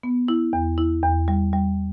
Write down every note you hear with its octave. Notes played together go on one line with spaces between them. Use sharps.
B3
E4
E2
E4
E2
G3
G3